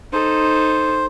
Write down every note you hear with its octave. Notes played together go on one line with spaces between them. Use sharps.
D#4 A4 C5